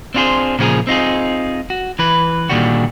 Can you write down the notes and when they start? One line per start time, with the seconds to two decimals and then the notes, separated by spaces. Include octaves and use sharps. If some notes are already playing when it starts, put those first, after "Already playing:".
0.14 C4 D4 F4 F#4 G#4 C5
0.59 A#2 C#3 F3 F4 G#4 A#4
0.87 C4 D#4 F4 G#4
1.70 F#4
1.99 E3 B4
2.49 A#2 D3 D#3 G3 F#4